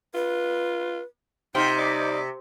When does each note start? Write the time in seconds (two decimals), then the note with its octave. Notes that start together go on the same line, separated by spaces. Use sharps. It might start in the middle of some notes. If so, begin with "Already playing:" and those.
0.14 F4 B4
1.55 C3 D#4 F4 F5 G5
1.78 G3 D5 D#5